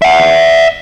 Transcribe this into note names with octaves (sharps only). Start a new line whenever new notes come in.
E5 F#5